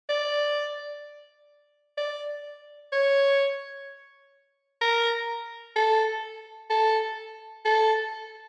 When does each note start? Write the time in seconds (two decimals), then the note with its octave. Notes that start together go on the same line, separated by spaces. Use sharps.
0.09 D5
1.98 D5
2.92 C#5
4.81 A#4
5.76 A4
6.70 A4
7.65 A4